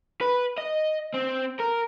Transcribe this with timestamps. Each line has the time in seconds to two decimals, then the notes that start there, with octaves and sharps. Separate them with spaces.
0.21 B4
0.58 D#5
1.14 C4
1.59 A#4